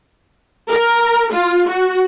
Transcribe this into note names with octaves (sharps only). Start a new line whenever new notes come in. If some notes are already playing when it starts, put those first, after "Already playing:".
A#4
F4
F#4